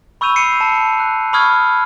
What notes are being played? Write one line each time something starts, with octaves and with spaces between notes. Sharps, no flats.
B5 C#6 E6 G6 D#7 F7
C7 C#7 D#7
A5
F#6
B5 C#6 D#6 F6 G#6